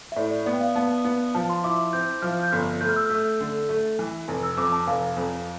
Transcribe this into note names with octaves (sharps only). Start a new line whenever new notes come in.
E5
A2 D5
D5
B3 D5
G5
F5
B3 A5
B3
F3 A5
C6
E4 D6
C4 G6
F3 F6
G6
G1 F6
A3 G6
F6
E6
A3 F6
D3
A3
E3
F1
E6
F2 D6
A5
F1 F5
F2